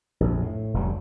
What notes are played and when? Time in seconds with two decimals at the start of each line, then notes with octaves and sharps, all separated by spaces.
0.20 A#1 F2
0.42 A2
0.74 F1 D2 F#3 G3